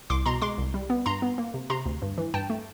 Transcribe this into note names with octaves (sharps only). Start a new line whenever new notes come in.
C2 C6 D6
B2 A#5 C6
G#3 C6 D6
C2
G3
B3
G2 A#5 C6
B3
A#3
C3
C3 A#5 C6
D2
G2
E3
G2 G5 A5
A3